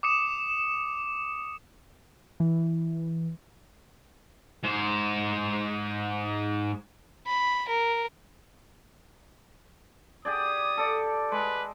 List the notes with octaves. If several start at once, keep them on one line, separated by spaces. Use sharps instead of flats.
D6 D#6 C#7 E7
E3
G#2 C5
B5
A#4
G4 G#4 D5 D#6
A4 D5
G#3 B4